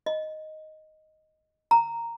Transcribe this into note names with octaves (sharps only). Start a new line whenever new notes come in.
D#5
A#5